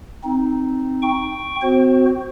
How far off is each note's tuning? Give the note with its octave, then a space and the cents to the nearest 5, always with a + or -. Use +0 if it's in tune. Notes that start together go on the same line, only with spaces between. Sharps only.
C4 +0 D#4 +0
G5 +0 C#6 +0
C4 -35 F#4 +0 C5 +25